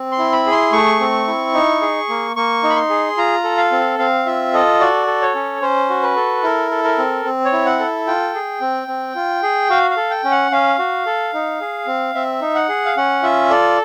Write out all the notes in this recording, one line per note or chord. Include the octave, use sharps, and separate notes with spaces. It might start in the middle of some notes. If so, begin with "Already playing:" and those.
Already playing: C4
C6
E4
B5
G#4
C6
A3 C#6
C4
E4
D#4
G#4
A#3
A#3 C#6
D#4
B5
C6
G#4
F4 A#5
A4
F5
C4
C4 F5
F4 E5
A4 D#5
F#4 D5
A4
C#5
C#4
C#4 C5
F#4
B4
A4
E4 A#4
A4
A#4
C4
C4
C#5
E4
F#5
A4
F4 G5
G#4
C4
C4
F4
G#4
F#4 F5
F5
A4
G5
C#4
F#5
C#4 F5
F#4
A4
D#4
G#4
C4
C4 E5
D#4
F#5
G#4
F5
C#4 F#5
F4 E5
A4 D5